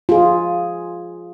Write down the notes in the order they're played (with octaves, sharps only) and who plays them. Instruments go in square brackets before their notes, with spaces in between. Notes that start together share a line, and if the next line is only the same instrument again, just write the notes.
[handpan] F4 G#4